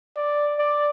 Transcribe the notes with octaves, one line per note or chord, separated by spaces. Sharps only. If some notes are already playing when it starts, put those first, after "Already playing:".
D5
D5